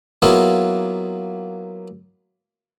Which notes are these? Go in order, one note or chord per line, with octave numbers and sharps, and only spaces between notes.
F#3 A#3 B3 E4 F4 G#4